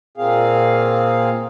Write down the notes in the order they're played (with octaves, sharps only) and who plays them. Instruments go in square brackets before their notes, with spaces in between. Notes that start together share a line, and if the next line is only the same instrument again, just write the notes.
[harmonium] A#2 A#3 C4 G#4 F5